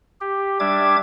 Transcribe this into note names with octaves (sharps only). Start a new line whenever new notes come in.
G4
G3 D4 E5 D6 G#6